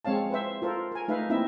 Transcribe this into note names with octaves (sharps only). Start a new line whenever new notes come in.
G#3 C4 C#5 F5 A5
B4 C5 E5
F4 A4 A#4 C5
A#4 G#5
A3 D#4 B4 E5 F5
A#3 C4 D#4 E4 E5